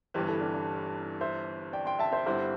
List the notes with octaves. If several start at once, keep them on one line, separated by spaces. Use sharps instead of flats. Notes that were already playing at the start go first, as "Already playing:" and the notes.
G1 G2 E3 G4 C5
E4 A4
D4 G4
D4
C5 E5
D5 G5
G5 C6
E5 A5
C5 E5
G1 G2 D3 C4 E4 G4 C5